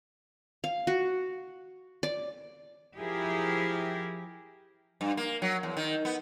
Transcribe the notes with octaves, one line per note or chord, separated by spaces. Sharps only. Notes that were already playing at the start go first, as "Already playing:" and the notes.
F5
F#4
D5
F3 E4 G4 G#4 A#4
G2
A#3
F#3
E2
D#3
B3